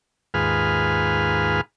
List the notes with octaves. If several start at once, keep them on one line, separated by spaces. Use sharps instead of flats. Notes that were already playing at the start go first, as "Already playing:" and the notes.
D#2 G#2 F4 G#4 B4 F6